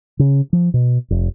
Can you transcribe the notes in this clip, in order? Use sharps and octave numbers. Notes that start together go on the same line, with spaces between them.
C#3
F3
B2
F1